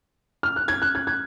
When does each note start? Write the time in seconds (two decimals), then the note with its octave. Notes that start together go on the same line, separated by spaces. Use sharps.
0.43 F6
0.56 F#6
0.68 G#6
0.82 F#6
0.95 G#6
1.07 G#6